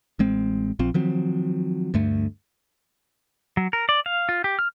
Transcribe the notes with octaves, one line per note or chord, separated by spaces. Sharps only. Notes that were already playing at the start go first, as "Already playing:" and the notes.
A1 G#3 C4
A#1 F3 C4
D#3 F3 F#3 C4
D2 G2 A3
F#3
A#4
D5
F5
F4
G4
F6